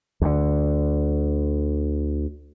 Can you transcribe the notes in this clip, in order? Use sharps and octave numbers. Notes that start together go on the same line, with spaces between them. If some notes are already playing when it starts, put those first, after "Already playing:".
D2 D3